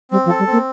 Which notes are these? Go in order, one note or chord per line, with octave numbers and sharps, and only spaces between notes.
G3 C4
F3
A4
G3
A#3 C4